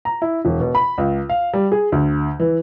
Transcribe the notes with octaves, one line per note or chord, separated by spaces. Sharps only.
A#5
E4
E1
B2
B5
C#2
F5
G3
G#4
D2
E3